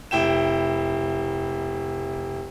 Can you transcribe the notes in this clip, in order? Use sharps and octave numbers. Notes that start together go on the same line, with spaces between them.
F1 E4 G5 E7